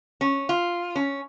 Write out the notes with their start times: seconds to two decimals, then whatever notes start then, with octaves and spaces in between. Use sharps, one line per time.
0.21 C#4
0.49 F4
0.96 C#4